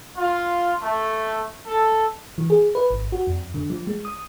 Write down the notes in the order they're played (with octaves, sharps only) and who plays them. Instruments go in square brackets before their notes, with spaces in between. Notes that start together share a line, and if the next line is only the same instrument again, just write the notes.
[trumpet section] F4
A3
A4
[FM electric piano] E3
G#4
B4
G#1
F#4
F2
D3
F3
G#3
D#6